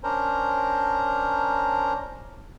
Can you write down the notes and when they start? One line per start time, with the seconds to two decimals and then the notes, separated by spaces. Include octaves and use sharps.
0.04 C#4 D4 A#4 C5 A#5